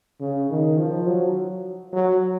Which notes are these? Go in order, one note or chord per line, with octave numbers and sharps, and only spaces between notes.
C#3
D#3
F3
F#3
F#3